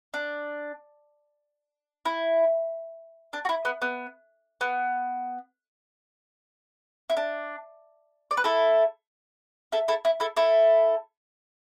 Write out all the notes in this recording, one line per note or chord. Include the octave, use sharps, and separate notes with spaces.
D4
E4
D4
F#4
E4
B3
B3
B3
E4
D4
D5
B4
E4 A4
E4 A4
E4 A4
E4
E4 A4
E4 A4